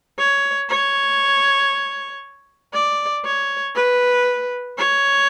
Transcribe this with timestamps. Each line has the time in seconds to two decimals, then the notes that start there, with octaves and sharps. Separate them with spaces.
0.18 C#5
0.69 C#5
2.74 D5
3.25 C#5
3.75 B4
4.78 C#5